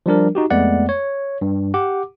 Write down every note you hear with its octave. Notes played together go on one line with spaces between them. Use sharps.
F3 G3 D4 A#4
D#4 F#4 G4
F2 G#3 A3 B3 D5 F#5
C#5
G2
G4 F#5 D6